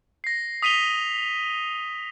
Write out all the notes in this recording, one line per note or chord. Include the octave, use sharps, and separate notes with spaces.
A#6 C7
D#6 B6 D#7 F7 G7